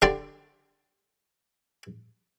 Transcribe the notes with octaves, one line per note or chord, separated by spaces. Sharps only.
D3 G4 D5 C6